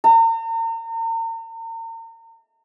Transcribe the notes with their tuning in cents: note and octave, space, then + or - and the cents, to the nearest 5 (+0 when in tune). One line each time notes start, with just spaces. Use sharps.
A#5 -40